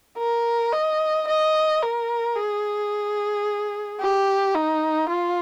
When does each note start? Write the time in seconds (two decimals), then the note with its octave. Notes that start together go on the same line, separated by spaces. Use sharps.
0.18 A#4
0.73 D#5
1.27 D#5
1.82 A#4
2.36 G#4
4.00 G4
4.55 D#4
5.09 F4